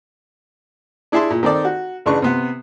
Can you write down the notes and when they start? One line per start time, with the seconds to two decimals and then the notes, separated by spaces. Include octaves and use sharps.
1.12 D4 E4 G#4 E5 A5 C6
1.30 A#2
1.43 D#3 C4 A4 D5 A5
1.65 F#4
2.06 A1 C#3 D4 B4 C#6
2.22 C3 B3